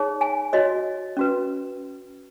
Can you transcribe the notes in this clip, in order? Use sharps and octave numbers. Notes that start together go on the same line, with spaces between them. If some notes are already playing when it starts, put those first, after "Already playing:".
Already playing: D#4 G#4 C#5
G#5
F#4 C#5 D#5
C#4 F#4 B4